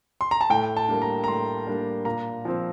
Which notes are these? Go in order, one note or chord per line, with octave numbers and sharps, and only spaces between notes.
C6
A#5
A5
A2 G5
A5
G3 A#3 D4
A#5
A#5
A2 C6
G3 A#3 D4
A#2 A#5
F3 C4